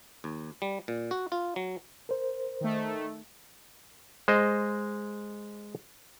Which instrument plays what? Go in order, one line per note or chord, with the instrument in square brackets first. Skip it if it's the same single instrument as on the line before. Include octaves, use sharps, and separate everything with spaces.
[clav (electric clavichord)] D#2
G3
A#2
F#4
F4
F#3
[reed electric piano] A#4 C5
[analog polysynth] D#3 A3
[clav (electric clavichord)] G#3 C5 D#5